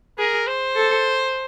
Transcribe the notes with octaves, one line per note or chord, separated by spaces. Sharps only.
G#4 A#4
C5
A4